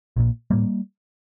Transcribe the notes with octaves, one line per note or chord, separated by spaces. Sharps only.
A#1 A#2
A2 G3 A#3